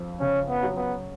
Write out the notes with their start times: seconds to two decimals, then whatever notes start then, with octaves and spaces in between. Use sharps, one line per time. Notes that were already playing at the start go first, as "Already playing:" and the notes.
Already playing: F2
0.20 C#3 C#4
0.49 B3
0.63 F#3
0.76 B3